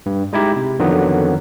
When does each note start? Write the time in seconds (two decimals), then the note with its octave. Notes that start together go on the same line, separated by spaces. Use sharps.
0.06 G2
0.33 G#3 D#4 E4 G4
0.56 C3
0.79 F2 D3 D#3 F#3 B3